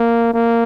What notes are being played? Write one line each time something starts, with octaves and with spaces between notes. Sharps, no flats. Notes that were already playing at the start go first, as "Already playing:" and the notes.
Already playing: A#3
A#3